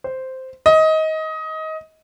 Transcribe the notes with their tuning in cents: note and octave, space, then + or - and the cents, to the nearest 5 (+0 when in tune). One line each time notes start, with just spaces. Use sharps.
C5 -5
D#5 +20